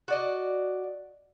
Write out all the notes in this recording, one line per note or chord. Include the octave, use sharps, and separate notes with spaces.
F#4 D5 D#5